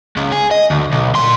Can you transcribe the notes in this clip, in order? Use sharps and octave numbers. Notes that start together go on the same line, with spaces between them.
C#2
G#4
D#5
D2
B1
A#2 C6